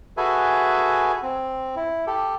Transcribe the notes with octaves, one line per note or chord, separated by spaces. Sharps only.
F#4 G#4 A4 B4 E5 G#5
C4
E4
G4 A4